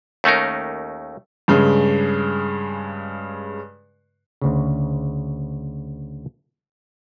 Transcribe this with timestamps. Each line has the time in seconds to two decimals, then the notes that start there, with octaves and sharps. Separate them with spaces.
0.24 D#2 A3 C#4 D#4 A#4
1.48 G2 C#3 G#3
4.42 D2 C#3